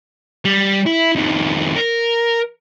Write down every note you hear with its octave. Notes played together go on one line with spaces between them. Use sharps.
G3
E4
F2 D#3
A#4